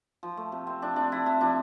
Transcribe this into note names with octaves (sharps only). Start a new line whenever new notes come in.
F3
A3
C3
C4
F3 D4
C3 D4
F3 E4
C3 E4
F3 D4